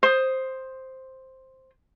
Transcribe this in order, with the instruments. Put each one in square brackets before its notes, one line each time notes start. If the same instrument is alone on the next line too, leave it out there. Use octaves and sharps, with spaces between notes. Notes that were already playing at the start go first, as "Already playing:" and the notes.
[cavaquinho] C5 D#6